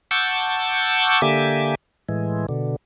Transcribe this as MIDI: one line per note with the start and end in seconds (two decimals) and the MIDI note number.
0.11 1.22 78
0.11 1.22 81
0.11 1.22 85
0.11 1.22 86
0.11 1.22 88
0.11 1.22 91
1.22 1.75 50
1.22 1.75 58
1.22 1.75 67
1.22 1.75 76
1.22 1.75 80
1.22 1.75 86
2.09 2.46 45
2.09 2.46 52
2.09 2.46 56
2.49 2.76 47
2.49 2.76 50